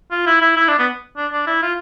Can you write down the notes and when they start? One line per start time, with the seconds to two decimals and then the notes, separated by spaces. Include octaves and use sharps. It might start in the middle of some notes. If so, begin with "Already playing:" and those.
0.11 F4
0.27 E4
0.42 E4
0.57 E4
0.68 D4
0.79 B3
1.17 D4
1.32 D4
1.47 E4
1.63 F4